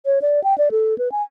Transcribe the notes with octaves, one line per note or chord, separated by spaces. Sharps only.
C#5
D5
G5
D5
A4
B4
G#5